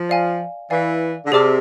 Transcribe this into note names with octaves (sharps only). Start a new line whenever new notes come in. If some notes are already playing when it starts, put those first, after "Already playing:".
Already playing: F3
D5 F5 G#5
E3 D5 F5 G#5
D3
C3 G#4 D5 A5 D6 F6